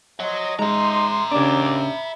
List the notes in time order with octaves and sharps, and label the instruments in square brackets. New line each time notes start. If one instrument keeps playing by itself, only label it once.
[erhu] C5 [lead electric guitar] C#5 F#5 [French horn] D#5
[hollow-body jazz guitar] G#3 [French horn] D#4 [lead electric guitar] E5 A#5 [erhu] C6
[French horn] D#2 [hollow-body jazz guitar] C#3 D4 [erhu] D6
[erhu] B5